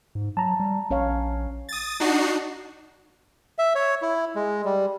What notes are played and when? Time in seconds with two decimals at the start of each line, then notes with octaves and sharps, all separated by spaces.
0.15 G#2
0.37 F#3 A5 A#5
0.60 G3
0.90 A#1 C#4 C#5 F5
1.69 D#6 A6
2.00 D4 D#4 F#4 C7
3.59 E5
3.75 C#5
4.02 E4
4.35 G#3
4.65 G3